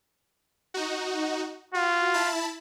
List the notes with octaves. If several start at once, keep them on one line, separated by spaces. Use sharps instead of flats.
D#4 F#4
F4 F#4
E4 A5 B5